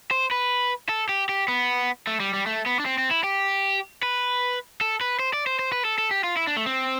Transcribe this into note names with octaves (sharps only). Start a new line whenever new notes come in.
C5
B4
A4
G4
G4
B3
A3
G3
G3
A3
B3
D4
C4
C4
E4
G4
B4
A4
B4
C5
D5
C5
C5
B4
A4
A4
G4
F4
E4
D4
A3
C4